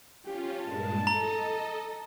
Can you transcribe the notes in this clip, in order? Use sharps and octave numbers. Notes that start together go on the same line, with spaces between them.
C#4 F4 G4
G2 A#2 G#3 A5
A4 D#5 A#5